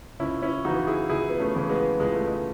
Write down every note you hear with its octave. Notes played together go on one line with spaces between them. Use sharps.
C#2 C#4 E4
C#4 E4
C#3 E3 D#4 F#4
E4 G#4
C#2 E4 G#4
B3
A3 C#4
C#3 E3
G#3 B3
C#2 G#3
A3
G#3